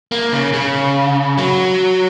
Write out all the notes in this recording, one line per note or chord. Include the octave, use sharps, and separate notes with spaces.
A#3
C#3
C#3
F#3